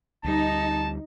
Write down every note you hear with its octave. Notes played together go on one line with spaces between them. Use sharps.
D2 G3 D#4 A5